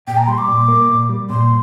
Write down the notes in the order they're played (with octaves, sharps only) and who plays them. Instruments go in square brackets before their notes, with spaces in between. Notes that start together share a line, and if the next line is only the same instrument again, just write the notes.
[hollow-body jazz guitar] A#2 [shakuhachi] G5
[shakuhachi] A#5
[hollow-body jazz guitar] G3 [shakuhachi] C6
[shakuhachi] D6
[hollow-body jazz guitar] A#2
A#3
A#2
G3
[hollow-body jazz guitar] A#2 [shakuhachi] C6